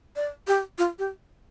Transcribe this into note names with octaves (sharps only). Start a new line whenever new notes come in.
D5
G4
F4
G4